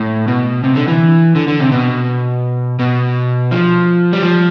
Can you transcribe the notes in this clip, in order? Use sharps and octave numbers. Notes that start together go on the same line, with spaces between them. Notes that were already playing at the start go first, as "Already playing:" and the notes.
Already playing: A2
B2
C3
D3
E3
D3
D3
C3
B2
B2
F3
G3
F3